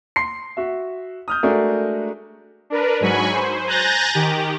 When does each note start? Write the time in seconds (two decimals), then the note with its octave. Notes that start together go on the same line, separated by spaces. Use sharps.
0.16 C6 C7
0.57 F#4 E5
1.28 D#6 F6 G6
1.43 G#3 A3 D4 F#4 G#4 A#4
2.70 D4 A#4 B4
3.01 G#2 F#3 G#5 B5 C#6
3.32 C5
3.67 G#5 A#5 F#6 G6 A6 A#6
4.15 D#3 G4